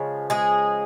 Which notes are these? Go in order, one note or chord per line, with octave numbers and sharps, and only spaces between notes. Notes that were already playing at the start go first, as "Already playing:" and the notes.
Already playing: C#3 F3 G#3
G#3 G#4